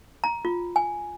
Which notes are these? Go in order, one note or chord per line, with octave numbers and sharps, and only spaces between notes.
A#5
F4
G#5